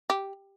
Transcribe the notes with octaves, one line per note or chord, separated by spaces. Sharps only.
G4